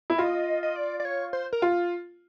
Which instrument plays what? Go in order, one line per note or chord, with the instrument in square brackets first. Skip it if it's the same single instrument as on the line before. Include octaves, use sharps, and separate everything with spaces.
[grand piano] E4
[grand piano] F4 [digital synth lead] D#5
[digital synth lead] D#5
D5
D5
C#5
C5
A#4
[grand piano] F4